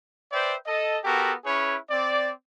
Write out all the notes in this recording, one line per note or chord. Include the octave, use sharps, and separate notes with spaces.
B4 C5 D5 E5 G5
A4 D#5
B3 F#4 G4 A4 A#4
C#4 E4 G#4 B4 C#5
C4 D5